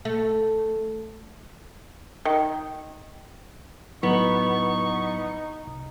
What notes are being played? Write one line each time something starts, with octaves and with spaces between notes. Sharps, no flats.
A3
D#3
A2 F#3 B3 D#4 E4 C#6
C2